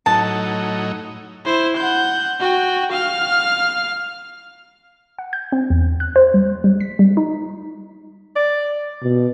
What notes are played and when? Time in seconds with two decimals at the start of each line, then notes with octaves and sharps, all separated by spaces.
0.06 A2 F#3 D#4 A5
1.45 E4 C5
1.77 F#5 G6
2.40 F#4 G5
2.91 F5 F6
5.19 F#5
5.33 G6
5.52 C4
5.70 E2
6.00 F#6
6.16 C5
6.34 G3
6.64 G3
6.80 B6
6.99 G3
7.17 D#4
8.36 D5
9.02 B2